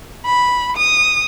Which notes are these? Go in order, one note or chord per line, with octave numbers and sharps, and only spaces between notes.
B5
D#6